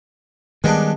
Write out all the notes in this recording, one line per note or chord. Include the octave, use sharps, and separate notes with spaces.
D#3 G3 G#3 B3 D4